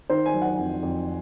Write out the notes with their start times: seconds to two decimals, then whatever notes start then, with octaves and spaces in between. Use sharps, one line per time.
0.10 D#3 C5
0.26 G#5
0.34 F#3
0.42 F#5
0.58 F2
0.82 F2